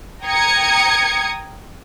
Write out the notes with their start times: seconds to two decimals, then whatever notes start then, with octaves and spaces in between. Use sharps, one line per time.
0.23 G5 A#5 D#6 G#6 C#7